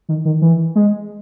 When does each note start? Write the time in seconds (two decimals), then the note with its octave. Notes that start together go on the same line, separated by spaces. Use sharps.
0.09 D#3
0.25 D#3
0.42 E3
0.75 G#3